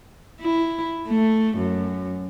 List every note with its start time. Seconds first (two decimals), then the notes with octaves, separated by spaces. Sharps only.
0.41 E4
1.08 A3
1.58 F#2